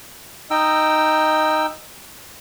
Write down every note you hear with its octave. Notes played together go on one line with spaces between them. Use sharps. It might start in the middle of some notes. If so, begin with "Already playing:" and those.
D#4 D#5 G5 E6